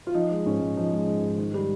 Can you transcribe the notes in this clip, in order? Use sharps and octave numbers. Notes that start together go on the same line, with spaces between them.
F4
F3 D#4
G#3
G#2 C#4
G#2
F3 D#4
G#3
G#2
G#2
D#3
G3